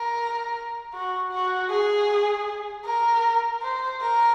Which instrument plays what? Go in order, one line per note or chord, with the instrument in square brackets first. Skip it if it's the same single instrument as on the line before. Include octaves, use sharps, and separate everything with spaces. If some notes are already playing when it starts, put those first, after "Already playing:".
Already playing: [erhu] A#4
F#4
F#4
G#4
A#4
C5
A#4